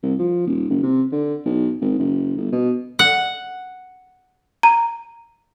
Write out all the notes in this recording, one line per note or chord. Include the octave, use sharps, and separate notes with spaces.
C2
F3
D#1
F#1
C3
D3
B1
G#1
F#1
G1
B2
F#5
A#5